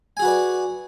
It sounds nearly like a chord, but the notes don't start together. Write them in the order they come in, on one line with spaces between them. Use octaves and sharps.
G#5 G#4 F#4 B4 D5